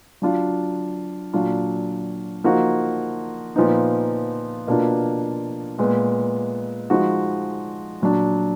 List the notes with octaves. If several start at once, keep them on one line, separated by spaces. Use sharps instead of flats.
F#3 D4 F4
A#2 F#3 D4 F4
F3 A#3 D#4 F#4
A#2 F3 B3 D#4
B2 A#3 D4 F4
A#2 G#3 B3
F3 G#3 D#4 F#4
A#2 F#3 D4